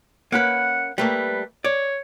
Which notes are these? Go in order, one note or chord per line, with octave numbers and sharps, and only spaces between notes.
A#3 C#4 B4 F#5
G3 A3 A#3 B4
C#5 D5